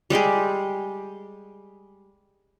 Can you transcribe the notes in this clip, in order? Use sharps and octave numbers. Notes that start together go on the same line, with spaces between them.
G3 G#3 G4 G#4